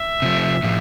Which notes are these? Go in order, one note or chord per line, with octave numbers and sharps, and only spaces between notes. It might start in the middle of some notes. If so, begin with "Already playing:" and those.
Already playing: E5
C3 F3 A3
A2 F3